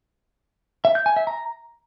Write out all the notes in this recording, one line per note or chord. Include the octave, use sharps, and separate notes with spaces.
E5
G6
G#5
E5
A#5